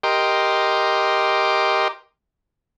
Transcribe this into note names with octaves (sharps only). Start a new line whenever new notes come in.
G4 A#4 D#5 C6 D6